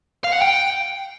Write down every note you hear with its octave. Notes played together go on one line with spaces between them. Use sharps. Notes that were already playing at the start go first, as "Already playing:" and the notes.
F5
F#5
G5